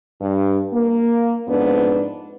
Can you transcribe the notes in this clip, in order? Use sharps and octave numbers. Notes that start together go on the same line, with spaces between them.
G2
A#3
F2 G#2 B3 D4 B4